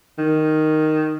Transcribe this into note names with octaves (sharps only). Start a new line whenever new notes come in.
D#3